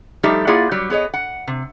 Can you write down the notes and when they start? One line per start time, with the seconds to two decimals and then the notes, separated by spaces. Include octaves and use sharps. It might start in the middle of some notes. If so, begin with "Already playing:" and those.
0.23 F3 G3 A3 D#4 G4 E5
0.47 A#3 E4 F4 G#4 D5 F#5
0.71 F#3 G3 G4
0.90 B3 G#4 C#5 D#5
1.14 F#5
1.47 C3